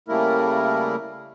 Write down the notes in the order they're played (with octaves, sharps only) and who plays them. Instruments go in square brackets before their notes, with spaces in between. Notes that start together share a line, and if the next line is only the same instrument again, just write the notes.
[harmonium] C#3 G3 A3 A#3 E4 A#4